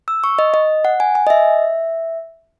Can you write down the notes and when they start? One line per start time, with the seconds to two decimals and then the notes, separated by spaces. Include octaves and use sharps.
0.08 E6
0.24 C#6
0.39 D#5
0.54 D#5
0.85 F#5
1.00 G#5
1.15 G#5
1.27 D#5
1.30 E5